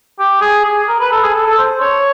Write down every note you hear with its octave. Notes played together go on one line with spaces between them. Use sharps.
G4
G#4
G#4
A#4
B4
A4
G#4
A4
A4
C5
C#5